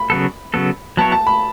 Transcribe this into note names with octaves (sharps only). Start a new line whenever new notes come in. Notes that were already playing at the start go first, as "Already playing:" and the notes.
Already playing: B5
C#3 F#3 B3 A4
C#3 F#3 B3 A4
F#3 B3 E4 C#5 A5
A5
B5